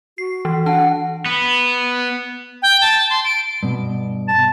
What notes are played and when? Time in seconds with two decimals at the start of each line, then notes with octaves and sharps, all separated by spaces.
0.18 F#4 C7
0.45 E3
0.66 D4 F#5 A5
1.26 B3
2.62 G5
2.81 A5
3.10 C6
3.24 D7
3.63 G2 B2
4.28 A5